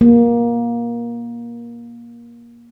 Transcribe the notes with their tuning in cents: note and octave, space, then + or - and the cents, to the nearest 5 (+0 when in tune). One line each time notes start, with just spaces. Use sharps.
A#3 +20